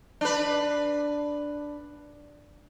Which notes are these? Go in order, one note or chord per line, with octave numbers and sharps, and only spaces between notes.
D4 B4